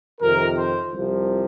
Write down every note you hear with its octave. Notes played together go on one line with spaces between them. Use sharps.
F2 C3 D#3 A#4
C5
C2 C3 F3